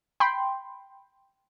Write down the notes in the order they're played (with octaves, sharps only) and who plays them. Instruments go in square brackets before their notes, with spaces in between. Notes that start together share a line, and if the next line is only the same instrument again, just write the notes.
[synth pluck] G5 B5 C6